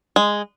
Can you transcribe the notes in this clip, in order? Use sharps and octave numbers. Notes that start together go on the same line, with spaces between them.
G#3